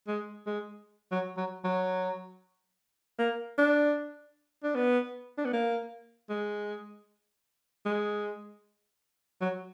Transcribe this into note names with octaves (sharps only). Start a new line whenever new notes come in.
G#3
G#3
F#3
F#3
F#3
A#3
D4
D4
B3
D4
B3
A#3
G#3
G#3
F#3